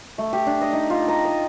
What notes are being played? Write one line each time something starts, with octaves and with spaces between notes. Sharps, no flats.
A3
G4
D4
D#5
D#4
F4
A#5
D#5